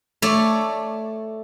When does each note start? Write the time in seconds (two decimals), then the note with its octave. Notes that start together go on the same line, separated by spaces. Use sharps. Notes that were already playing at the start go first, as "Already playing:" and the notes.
0.22 A3 C#5 D5